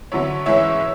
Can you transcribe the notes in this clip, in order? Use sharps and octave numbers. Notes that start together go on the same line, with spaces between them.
D3 F#3 B3 E4 C#5
G#2 E3 G#3 C#4 E4 C#5 E5